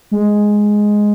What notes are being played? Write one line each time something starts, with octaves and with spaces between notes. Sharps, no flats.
G#3